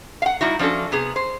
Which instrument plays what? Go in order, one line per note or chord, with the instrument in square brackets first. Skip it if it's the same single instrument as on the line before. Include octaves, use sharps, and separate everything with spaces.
[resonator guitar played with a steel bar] F5 F#5
G3 D#4 E4 F#4
F3 C#4 D4 F#4 A4
C3 B3 G#4
C5